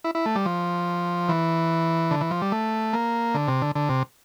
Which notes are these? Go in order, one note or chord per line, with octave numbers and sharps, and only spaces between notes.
E4
E4
A3
G3
F3
E3
D3
E3
F3
G3
A3
A#3
D3
C3
D3
D3
C3